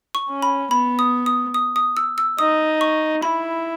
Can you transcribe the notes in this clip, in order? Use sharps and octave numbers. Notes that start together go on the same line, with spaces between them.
C#6
C#4
B5
B3 B5
D#6
D#6
D#6
D#6
E6
E6
D#4 D#6
C#6
E4 B5